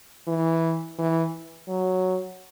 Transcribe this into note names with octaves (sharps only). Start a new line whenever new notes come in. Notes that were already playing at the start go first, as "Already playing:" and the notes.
E3
E3
F#3